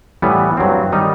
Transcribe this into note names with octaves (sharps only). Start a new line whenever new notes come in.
A2 E3 G3 B3
G2 F#3 C4
D#3 G3 D#4